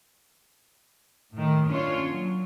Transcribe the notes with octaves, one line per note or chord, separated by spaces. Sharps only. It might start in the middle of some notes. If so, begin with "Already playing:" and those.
A2 D#3
A#2 C#4 D4 F4 C#5
F#3